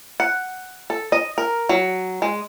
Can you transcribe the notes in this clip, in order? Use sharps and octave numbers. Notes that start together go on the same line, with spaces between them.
F#5
A4
D#5
A#4
F#3
G#3